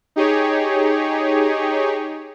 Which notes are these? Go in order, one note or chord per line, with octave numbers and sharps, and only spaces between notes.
D#4 G4 G#4 C#5